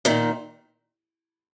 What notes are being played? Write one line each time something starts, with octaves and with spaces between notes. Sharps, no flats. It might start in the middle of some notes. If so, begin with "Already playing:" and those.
A#2 D#3